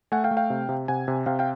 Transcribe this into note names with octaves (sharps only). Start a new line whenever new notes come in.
A3 F#5 G#5
F5 G5
A3
F5 G5
C3
C3
C3 F#5 G#5
C3
C3 F5 G5
F5 G5